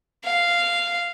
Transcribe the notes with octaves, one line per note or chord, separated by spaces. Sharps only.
F5